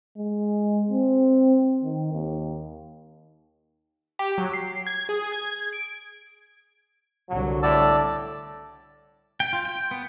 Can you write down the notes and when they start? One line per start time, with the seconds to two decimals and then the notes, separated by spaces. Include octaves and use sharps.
0.17 G#3
0.89 C4
1.83 D#3
2.13 D#2
4.19 G4
4.38 F#3
4.53 C7
4.87 G#6
5.09 G#4
5.32 G#6
5.73 D7
7.29 C2 D3 F#3
7.63 A2 D5 A5 E6
9.40 G5
9.53 F4
9.65 G5
9.91 B3